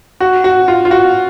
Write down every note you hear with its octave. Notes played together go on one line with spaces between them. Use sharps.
F#4
F#4
F4
F4
F#4